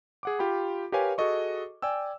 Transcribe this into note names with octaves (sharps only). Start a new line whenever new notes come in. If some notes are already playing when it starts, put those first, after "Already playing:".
G#4 F#5 D6
F4 G4 G5 B5
G4 A#4 B4 C#5 F5 G#5
F#4 G#4 A4 D#5 C#6
D5 G5 G#5 E6